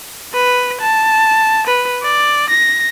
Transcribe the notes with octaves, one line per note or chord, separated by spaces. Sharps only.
B4
A5
B4
D5
A#6